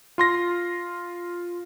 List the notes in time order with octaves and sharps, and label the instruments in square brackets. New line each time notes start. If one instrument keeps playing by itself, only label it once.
[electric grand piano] F4 C6 A#6